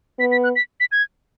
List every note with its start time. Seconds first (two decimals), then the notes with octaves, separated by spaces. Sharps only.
0.19 B3 B6
0.32 B6
0.44 F#6
0.56 B6
0.80 B6
0.92 G#6